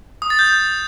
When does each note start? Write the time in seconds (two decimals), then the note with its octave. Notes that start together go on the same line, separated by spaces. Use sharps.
0.22 D#6
0.30 A6
0.39 G6